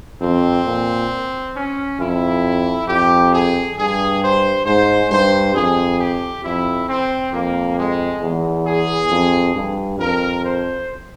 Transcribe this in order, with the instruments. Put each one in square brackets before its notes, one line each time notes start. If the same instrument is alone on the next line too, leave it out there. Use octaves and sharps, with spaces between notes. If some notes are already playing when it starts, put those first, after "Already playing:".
[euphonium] F2 [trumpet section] C4
[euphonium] A#2
[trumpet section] C#4
[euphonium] F2 [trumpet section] E4
[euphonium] F2 [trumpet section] G4
[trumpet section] G#4
[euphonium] G2 [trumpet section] G#4
[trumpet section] C5
[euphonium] G#2 [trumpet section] C5
[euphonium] G2 [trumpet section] C5
[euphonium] F2 [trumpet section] G#4
[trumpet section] G4
[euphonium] F2 [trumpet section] E4
[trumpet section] C4
[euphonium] F2 [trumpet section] A#3
[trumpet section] G#3
[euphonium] E2
[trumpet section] G#4
[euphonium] F2
G2
[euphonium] F2 [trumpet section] A#4
[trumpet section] C5